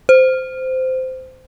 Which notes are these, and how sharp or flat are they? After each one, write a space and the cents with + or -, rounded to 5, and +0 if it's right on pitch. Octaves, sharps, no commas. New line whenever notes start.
C5 -15